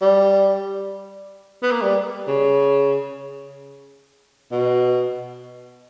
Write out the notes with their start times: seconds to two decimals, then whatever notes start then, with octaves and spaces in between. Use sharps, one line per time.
0.01 G3
1.62 B3
1.72 A#3
1.82 G3
2.27 C#3
4.52 B2